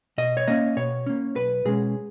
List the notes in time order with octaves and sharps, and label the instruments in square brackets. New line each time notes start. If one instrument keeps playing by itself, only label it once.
[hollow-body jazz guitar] B2 D#5
C#5
A#3 C#4 D#5
B2 C#5
A#3 C#4
B1 B4
B2 G#3 C#4 G#4